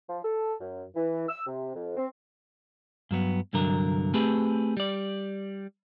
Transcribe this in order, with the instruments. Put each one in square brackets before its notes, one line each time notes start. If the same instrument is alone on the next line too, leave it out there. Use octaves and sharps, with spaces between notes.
[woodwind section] F3
A4
F#2
E3
E6
C3
F2
C4
[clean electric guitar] G2 F#3 B3
C2 G2 D3 F#3 A#4
A3 C4 G4 G#4 B4
G3 D5